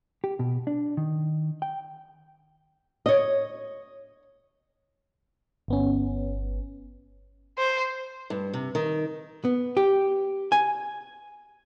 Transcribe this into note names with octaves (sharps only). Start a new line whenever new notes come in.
G4
B2
D4
D#3
G5
C#5 D#5
G1 B3 C#4
C5
G2
C3
D#3
B3
G4
G#5